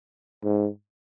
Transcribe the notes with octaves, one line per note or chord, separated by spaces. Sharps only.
G#2